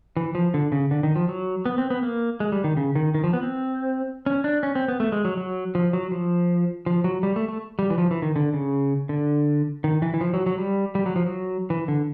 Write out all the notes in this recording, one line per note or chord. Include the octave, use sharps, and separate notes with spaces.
E3
F3
D3
C#3
D3
D#3
F3
F#3
B3
C4
B3
A#3
G#3
G3
D#3
C#3
D#3
D#3
F3
B3
C4
C#4
D4
C#4
C4
B3
A3
G#3
F#3
F#3
F3
F#3
F3
F3
F#3
G3
A3
A3
G3
E3
F3
E3
D#3
D3
C#3
D3
D#3
E3
E3
F3
F#3
F#3
G3
G3
F#3
F3
F#3
E3
D3